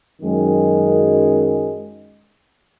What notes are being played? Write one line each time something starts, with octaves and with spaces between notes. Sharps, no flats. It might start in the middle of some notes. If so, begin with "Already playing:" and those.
F#2 D#3 G#3